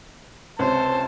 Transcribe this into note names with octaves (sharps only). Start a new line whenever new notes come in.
C#2 C3 C5 C#5 A5